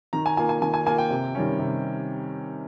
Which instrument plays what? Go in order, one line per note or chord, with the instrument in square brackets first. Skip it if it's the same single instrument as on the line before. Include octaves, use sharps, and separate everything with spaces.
[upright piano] D#3 A#5
G#5
A#3 F4 G#5
G#5
D#3 G#5
G#5
A#3 F4 G#5
G5
C3
D#3 G3 C#4
C3